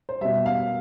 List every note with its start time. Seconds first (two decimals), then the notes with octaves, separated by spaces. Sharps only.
0.09 C5
0.21 B2 G3 E5
0.46 F5